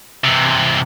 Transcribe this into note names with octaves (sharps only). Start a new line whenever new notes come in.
C3 E3